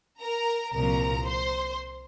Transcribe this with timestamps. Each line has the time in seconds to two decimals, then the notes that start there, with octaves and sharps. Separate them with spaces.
0.21 A#4 A#5
0.73 C2 A#2 F3 A#4 A#5
1.26 C5 C6